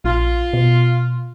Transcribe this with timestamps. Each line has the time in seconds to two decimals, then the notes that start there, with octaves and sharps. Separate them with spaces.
0.05 A#1 F4
0.53 B2